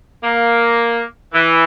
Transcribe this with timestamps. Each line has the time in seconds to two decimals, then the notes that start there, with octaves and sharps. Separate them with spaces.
0.24 A#3
1.34 E3